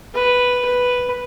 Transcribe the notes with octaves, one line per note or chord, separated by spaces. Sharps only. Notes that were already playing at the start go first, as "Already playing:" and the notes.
B4
B4